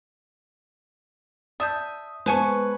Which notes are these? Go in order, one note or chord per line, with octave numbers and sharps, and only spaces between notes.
D5 E5 A5 D#6 G6
G#3 B3 B4 C5 G#5 A5 C#6